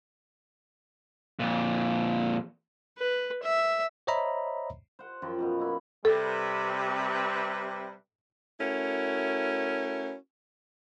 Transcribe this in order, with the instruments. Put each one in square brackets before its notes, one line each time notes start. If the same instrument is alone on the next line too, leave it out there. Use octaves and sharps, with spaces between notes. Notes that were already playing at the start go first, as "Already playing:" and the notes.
[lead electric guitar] F2 A#2
[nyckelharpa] B4
E5
[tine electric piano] C5 C#5 D#5 E5 A#5 B5
[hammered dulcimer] C5 F#5
F#2 F3 G5
F#2 B2 B3
A#3 E4 B5
[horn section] C3 G3 B4 [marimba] A4
[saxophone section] A3 C#4 E4 F#4 A#4